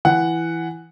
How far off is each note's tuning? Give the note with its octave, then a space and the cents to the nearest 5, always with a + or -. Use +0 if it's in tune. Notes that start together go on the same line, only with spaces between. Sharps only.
E3 +10 F#5 +0